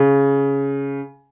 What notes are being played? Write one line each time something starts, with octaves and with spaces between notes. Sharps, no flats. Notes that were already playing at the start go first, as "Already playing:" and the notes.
Already playing: C#3